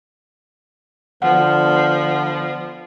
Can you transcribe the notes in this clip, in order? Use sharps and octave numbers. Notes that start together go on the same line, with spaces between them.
D3 F3 B3 F#5